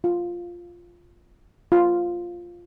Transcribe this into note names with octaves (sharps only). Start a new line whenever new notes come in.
F4
F4